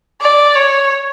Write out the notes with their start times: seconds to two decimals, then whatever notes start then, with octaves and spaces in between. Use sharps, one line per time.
0.21 D5
0.55 C#5